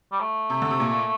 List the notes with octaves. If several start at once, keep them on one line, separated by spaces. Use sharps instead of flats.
G3
A3
C3
D3
C3
A#2